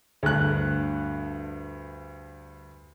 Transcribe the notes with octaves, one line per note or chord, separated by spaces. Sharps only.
D2 G2 F#6